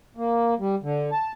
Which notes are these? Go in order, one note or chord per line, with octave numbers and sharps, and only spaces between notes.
A#3
G3
D3
A5